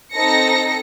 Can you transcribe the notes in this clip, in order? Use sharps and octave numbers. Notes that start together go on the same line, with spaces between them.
C4 D#4 A4 A#6 C#7